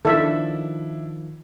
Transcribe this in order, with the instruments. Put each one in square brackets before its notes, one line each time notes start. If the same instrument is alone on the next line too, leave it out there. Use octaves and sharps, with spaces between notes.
[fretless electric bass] D#3 F3 [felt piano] D4 E4 [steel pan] A4 E5